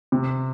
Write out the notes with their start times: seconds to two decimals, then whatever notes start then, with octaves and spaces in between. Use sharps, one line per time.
0.12 C3